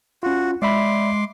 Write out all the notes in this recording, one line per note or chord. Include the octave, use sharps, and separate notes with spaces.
C#4 F4 F#4
G#3 D5 E5 B5 C6 D6